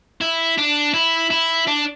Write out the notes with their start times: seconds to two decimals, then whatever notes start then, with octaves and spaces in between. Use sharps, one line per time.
0.21 E4
0.58 D4
0.94 E4
1.31 E4
1.67 D4